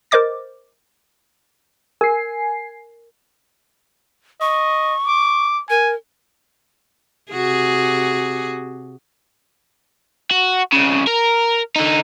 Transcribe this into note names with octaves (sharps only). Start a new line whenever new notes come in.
A#4 C5 D#5 D6 A6
A#4 G#5 C7
D#5 C#6
D6
A#4 G#5
C3 F#4 G#4
F#4
C2 C#3
A#4
D3 D#4